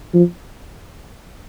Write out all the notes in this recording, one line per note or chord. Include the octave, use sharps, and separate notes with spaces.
F3